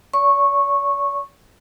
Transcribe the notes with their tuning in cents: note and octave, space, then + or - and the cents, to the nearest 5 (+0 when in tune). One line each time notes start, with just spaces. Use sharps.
D5 -45 C#6 -10